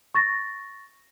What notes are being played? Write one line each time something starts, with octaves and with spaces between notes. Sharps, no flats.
C#6 A6 A#6